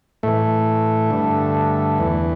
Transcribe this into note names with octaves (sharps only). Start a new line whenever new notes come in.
A2 E3 A3
G2 D3
E2 E3